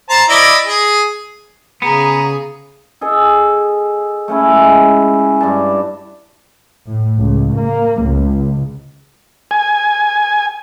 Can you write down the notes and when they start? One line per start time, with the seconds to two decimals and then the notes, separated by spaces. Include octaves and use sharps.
0.10 C5 A5 A#5
0.29 E4 D5 D#5
0.67 G#4
1.82 C#3 B3 G#4 A#5
3.01 G#4 A4 D#5
4.28 A3 C#4 E4
4.51 G#3
5.41 G2 D4 A5
6.86 A2
7.18 C#2
7.55 A#3
8.03 C#2
9.51 G#5